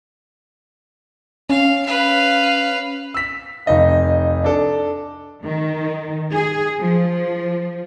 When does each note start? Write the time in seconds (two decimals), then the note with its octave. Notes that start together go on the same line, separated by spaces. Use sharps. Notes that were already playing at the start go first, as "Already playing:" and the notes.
1.50 C#4 F5
1.86 B4 F5
3.14 E6 B6
3.66 F1 D#4 D#5 F5
4.44 D4 A4
5.44 D#3
6.32 G#4
6.82 F3